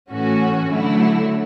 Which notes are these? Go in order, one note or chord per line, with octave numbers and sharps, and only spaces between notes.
A2 E3 A3 C#4 F#4
D3 F#3 A3 E4